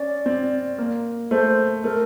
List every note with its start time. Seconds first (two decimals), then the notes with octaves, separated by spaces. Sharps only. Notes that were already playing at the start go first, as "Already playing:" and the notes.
Already playing: C#4 D5
0.26 C4
0.78 A#3
1.31 A3 C5
1.84 A3 A#4